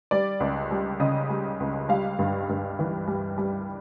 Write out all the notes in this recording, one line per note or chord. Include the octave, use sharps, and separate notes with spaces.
G3 D5
C#2
G3
C#3 D#5
G3
C#2
G3 F5
G2
G2
E3
G3
G3